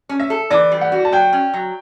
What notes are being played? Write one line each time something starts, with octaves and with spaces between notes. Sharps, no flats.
C#4
E5
A4
E3 D5
G3
F#5
F#4
A5
F#3 G5
C#4
F#3